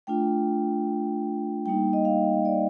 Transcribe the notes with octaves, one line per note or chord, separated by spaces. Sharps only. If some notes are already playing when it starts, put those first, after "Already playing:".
A3 D4 F4 G5
G3 A#3 D#4 G5
D#5
F5
D5